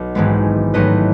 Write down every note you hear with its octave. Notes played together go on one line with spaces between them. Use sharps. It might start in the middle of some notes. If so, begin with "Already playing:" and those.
Already playing: B1 D#5 F#5
G#1 G#2 E3 G#3 B3
A1 G#2 F#3 A3 B4 D#5